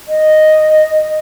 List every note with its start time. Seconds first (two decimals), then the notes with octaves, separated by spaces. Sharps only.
0.08 D#5